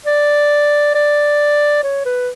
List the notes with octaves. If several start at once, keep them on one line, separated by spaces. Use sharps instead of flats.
D5
D5
C#5
B4